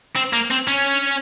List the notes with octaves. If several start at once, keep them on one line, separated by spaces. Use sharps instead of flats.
C4
A#3
C4
C#4